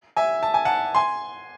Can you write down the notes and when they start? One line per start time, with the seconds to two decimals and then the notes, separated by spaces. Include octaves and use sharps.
0.16 E5 G#5
0.43 A5
0.54 G#5
0.65 F#5 A5
0.95 G#5 C6